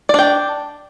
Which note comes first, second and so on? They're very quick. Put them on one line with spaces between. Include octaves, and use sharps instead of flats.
D5 D4 G5